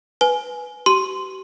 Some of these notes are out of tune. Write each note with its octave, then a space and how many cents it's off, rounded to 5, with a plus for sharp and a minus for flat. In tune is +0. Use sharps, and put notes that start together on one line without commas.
B4 +0 G#5 +15
G4 -45 C6 -5